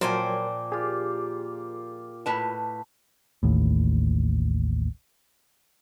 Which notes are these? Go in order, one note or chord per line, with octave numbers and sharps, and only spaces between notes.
A#2 F3 F#3 A#4 C5 C#5 G5 G#5
F4 G4 G#4
A2 B4 A5
A1 D#2 A2